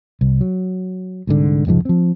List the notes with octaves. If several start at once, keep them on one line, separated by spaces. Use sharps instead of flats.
C2
F#3
C2 G#2 D3
F1 C#2 G#2 F3
F3 C4